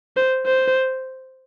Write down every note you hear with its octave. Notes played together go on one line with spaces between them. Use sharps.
C5
C5